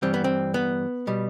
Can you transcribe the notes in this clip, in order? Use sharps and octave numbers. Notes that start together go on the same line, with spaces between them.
G2 E3 G3 C4
B3
C4
B3
B2 G3